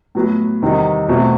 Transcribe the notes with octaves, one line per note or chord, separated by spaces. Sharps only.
A2 F#3 B3
E2 C3 D#3 G3 D#4
E2 B2 A3 C4 E4